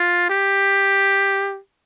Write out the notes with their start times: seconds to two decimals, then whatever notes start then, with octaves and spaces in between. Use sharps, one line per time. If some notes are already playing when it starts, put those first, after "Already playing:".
Already playing: F4
0.30 G4